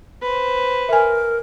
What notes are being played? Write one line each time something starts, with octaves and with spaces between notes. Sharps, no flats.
B4 C5
A#4 E5 G#5